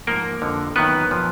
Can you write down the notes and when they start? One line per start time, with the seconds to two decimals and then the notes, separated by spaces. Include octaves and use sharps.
0.07 G#2 F3 A#3 A#4
0.42 F2 D3 F3
0.76 F#2 D#3 F#3 B3 B4
1.11 A#2 F3